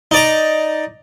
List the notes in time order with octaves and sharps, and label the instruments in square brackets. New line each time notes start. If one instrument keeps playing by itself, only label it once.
[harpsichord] D#4 D5 A#5